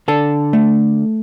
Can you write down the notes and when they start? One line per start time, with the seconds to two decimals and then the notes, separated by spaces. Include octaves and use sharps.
0.08 D3 A4 A5
0.53 A3